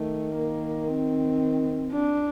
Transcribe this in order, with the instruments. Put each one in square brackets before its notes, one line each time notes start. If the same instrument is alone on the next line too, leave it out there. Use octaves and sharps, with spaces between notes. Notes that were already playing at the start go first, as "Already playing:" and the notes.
Already playing: [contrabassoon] D#3 [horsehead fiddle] A3
[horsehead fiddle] A#3
C4
D4